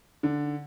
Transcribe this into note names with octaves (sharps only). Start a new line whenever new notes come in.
D3